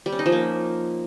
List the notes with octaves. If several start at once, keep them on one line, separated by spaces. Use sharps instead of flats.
G3
C#4
D#4
F3
A#3